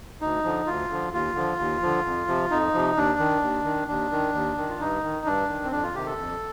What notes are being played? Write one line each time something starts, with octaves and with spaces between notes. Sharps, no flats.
D2 D#4
D3 F3
D2 F4
D3 F3
D#2 F4
D3 F3
D#2
D3 F3
F2
C3 F3
F2 D#4
C3 F3
D#2 D4
D#3
D#2
D#3
D#2 D4
D#3
D#2
D#3
F4
G2 D#4
D#3
G2 D4
D#3
C4
F2 D4
F4
C3 D#3 G4
A4
F2